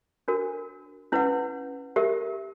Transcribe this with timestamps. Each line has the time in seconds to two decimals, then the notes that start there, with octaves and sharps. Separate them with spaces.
0.28 D4 F#4 A#4
1.12 C#4 E4 B4 F#5
1.96 G4 A#4 E5